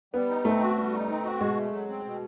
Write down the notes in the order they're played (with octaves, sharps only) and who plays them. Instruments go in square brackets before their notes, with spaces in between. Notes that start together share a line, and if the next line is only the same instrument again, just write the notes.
[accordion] G3 [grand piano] B3
[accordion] D#4
[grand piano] A3 [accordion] C4
[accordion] F#4
G3
D#4
C4
F#4
[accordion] B2 [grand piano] G#3
[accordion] A3
F#3
C4
B2